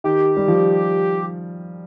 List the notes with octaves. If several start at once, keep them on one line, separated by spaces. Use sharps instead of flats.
D#3 G4
G3
F3